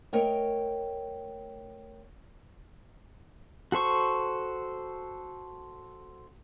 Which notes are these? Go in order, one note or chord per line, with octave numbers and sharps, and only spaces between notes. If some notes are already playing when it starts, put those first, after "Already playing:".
A3 A#4 C#5 D#5 G5
F#4 A4 C5 C#6